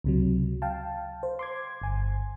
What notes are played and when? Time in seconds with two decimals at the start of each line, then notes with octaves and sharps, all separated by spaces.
0.04 C#2 C3 F#3
0.62 F5 G5 A5
1.23 C5
1.39 C6 D6 G#6
1.82 G1 G#5